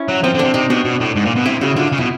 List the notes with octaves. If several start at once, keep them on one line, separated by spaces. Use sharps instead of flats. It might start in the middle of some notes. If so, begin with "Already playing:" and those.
Already playing: C#4 E4
F#3
F3 C4
D3
C3 D4
C3 D#4
B2 D4
B2
A2
G#2
A#2
B2
C3 E4
C#3 F#4
D3 F4
C#3 F4
B2 E4